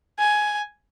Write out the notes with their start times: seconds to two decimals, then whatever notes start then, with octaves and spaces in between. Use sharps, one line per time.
0.19 G#5